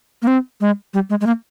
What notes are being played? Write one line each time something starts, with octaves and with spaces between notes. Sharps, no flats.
A#3
C4
G#3
G3
G#3
G#3
A#3